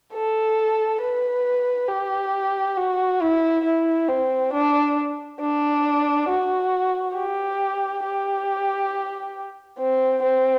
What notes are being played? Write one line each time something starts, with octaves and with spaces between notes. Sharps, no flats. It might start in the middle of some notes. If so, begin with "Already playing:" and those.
A4
B4
G4
F#4
E4
E4
C4
D4
D4
F#4
G4
G4
C4
C4